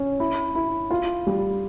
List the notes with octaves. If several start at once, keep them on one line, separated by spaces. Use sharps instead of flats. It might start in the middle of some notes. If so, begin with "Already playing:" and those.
Already playing: C#4
E4
E4
F4
G3